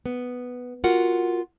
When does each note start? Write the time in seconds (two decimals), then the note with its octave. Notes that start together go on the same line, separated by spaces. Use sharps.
0.06 B3
0.84 F4 F#4 A#4 F#5